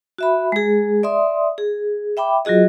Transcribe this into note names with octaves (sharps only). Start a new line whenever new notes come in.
F#4 E5 B5
G#3 G#4
D5 E5 C6 D#6
G#4
E5 G5 B5 D6
F#3 F4 F#4 G#4 D#5